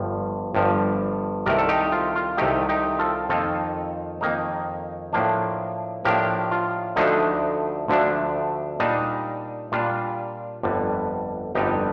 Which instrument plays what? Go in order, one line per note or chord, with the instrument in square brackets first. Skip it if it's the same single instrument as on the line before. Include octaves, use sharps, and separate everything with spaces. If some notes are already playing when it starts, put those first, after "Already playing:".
Already playing: [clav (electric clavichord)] G1 G2 F3
G1 G2 F3
C2 C3 D#3 A3 A#4 D5
A4
D#4 G4
F4
F4
C2 C3 D#3 A3 D#4 G4
D#4 G4
F4 A4
F2 D#3 A#3 D#4 F4 A4
F2 D#3 A#3 D#4
A2 F3 A#3 D4
A2 F3 A#3 D4 G4 A#4
F4
D2 D3 F3 A3 D4 D#4
D2 D3 F3 A3 D4
A#2 G3 D4 D#4
A#2 G3 D4 F4
G1 F2 D3 G3
G1 F2 D3 G3 D#4 G4